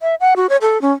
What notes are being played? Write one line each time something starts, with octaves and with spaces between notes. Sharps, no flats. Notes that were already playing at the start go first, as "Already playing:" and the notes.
E5
F#5
F#4
C#5
A4
C#4